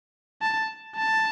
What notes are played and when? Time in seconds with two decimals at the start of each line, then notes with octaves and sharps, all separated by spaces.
0.42 A5
0.97 A5